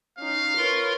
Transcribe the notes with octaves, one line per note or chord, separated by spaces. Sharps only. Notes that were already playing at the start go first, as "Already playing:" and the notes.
C#4 D#4 F5
F4 A#4 B4 C#5 C6